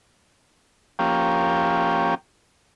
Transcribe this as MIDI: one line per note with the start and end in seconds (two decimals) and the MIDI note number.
0.99 2.15 53
0.99 2.15 58
0.99 2.15 61
0.99 2.15 67